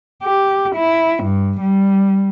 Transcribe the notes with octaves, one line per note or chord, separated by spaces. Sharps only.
G4
E4
G2
G3